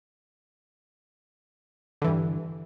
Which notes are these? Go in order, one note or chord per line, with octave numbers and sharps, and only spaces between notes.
G2 D3 E3